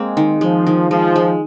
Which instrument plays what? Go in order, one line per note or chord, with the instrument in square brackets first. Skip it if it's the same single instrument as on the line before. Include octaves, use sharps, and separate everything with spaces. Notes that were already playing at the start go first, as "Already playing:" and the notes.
Already playing: [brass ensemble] G#3 [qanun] A#3 C4
[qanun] D#3
[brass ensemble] F3 [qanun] G#3
[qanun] D#3
[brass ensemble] F3 [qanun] G#3
[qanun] G#3